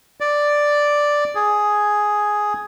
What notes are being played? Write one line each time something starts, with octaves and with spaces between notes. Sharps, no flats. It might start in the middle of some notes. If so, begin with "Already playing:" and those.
D5
G#4